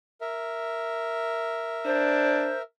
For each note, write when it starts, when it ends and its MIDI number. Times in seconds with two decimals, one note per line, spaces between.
0.21 2.62 70
0.21 2.62 76
1.85 2.52 62
1.85 2.59 72